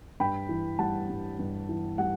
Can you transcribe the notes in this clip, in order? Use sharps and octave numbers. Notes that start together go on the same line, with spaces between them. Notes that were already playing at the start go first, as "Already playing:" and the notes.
G2 G5 B5
E3
G3 F#5 A5
G2
G2
E3
G3 F#5